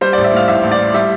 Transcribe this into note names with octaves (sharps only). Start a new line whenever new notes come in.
G3 C5
D5
A1
E5
A2 F5
A1 E5
A1
D5
A2
G3 E5